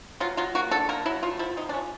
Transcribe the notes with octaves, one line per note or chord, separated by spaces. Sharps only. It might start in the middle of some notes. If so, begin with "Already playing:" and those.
F#3 F4
F#3 F4
A#3 F#4
D3 A4
A#3 A#4
F#3 E4
A3 F4
F3 E4
C3 D#4
D4
F3 C#4